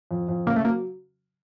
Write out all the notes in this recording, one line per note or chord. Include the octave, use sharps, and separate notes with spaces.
F2
F2
C#3 A#3
A3
F#3 A#3